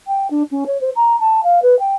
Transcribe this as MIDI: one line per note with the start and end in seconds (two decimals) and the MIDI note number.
0.07 0.27 79
0.30 0.43 62
0.51 0.64 61
0.66 0.80 73
0.81 0.90 72
0.96 1.18 82
1.20 1.41 81
1.43 1.59 77
1.62 1.78 71
1.79 1.95 79